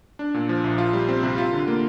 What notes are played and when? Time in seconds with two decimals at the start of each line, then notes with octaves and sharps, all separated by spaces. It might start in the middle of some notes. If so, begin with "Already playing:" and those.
0.19 D4
0.34 A#2
0.49 F3
0.64 A#1
0.78 F4
0.93 G3
1.08 C4
1.23 C3
1.38 F4
1.53 D3
1.68 A#3